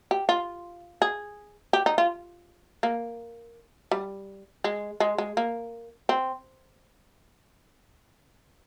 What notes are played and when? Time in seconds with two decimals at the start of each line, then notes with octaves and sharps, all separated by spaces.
0.11 G4
0.29 F4
1.02 G#4
1.73 G4
1.86 D#4
1.98 F4
2.83 A#3
3.91 G3
4.64 G#3
5.00 G#3
5.18 G#3
5.37 A#3
6.09 C4